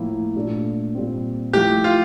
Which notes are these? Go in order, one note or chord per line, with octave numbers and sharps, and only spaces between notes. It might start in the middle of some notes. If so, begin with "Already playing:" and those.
Already playing: A2 F3 A#3 E4
A#2 A3 D4
A#2 G3 C4
F3 A3 E4 G4
F4